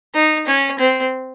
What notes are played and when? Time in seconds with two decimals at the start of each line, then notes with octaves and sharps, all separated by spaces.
0.14 D#4
0.47 C#4
0.79 C4